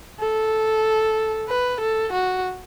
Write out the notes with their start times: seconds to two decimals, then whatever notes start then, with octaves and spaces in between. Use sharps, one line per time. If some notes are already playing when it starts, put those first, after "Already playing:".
0.19 A4
1.48 B4
1.81 A4
2.13 F#4